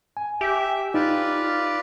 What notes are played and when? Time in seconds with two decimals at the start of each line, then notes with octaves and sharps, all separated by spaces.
0.17 G#5
0.41 G4 E5
0.94 D#4 F4 B4 D5